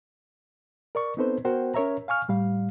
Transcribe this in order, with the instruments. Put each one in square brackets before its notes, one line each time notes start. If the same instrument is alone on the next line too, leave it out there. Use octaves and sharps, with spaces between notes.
[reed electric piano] A#4 D5 C#6
B3 C4 D#4 A4 B4 C5
B3 F#4 A#4 C5 F#5 G5
C#4 A#4 C#5 E5 A#5
F5 G#5 C#6 F6
A2 G3 F5